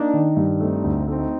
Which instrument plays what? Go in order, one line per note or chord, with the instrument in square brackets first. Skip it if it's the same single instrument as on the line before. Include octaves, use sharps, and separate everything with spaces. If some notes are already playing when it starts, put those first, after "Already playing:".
Already playing: [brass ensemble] A#3 D4 [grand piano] D#4
[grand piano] D#3
G2
[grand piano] A3 [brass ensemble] C4 D#4
[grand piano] D2
[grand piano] A3 [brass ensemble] C4 D#4